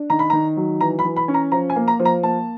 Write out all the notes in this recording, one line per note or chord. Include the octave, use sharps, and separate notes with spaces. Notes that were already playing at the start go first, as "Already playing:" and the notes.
Already playing: D4
D#3 A#5
B5
D#3 A#5
F#3
E3 A#5
B5
E3
B5
C#4
A#5
F3 A#5
G#5
A#3
A#5
F3
A#5
A#3 A5